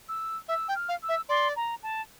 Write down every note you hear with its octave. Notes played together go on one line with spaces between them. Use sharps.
E6
E5 E6
G5
F6
F5
E6
E5
D5 C6
A#5
A5